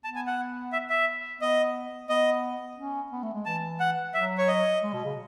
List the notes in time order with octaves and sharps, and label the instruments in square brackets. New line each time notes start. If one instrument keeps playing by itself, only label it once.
[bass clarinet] B3 [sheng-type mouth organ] A5
[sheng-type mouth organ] G#5
F#5
E5
E5
[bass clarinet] B3 [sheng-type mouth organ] D#5
[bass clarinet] B3 [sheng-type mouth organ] D#5
[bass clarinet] C#4
B3
A3
G#3
[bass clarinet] E3 [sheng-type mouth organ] A5
[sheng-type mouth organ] F#5
[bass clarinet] F#3 [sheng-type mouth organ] E5
[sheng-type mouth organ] C#5
D#5
[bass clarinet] G#3
B2
C#3